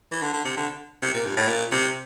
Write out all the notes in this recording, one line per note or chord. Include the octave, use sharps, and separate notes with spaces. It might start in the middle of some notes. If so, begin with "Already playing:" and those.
E3
D3
D3
C3
D3
C3
A#2
G2
A2
A#2
C3